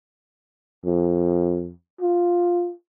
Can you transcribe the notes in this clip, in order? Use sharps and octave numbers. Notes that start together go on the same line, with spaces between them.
F2
F4